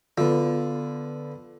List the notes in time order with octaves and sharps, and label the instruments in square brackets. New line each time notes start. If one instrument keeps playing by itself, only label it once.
[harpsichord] D3 [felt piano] B3 F4